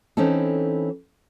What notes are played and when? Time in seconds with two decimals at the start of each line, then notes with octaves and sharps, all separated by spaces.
0.17 E3 C4 C#4 D#4 A4